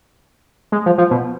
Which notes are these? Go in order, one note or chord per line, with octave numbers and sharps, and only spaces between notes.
G#3
F3
F3
B2